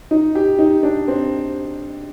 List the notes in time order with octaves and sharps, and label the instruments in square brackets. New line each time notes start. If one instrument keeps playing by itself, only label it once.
[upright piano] D#4
G4
D#4
D4
C4